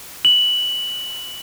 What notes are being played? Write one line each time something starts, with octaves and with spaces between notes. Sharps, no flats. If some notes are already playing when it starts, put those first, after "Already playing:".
F#7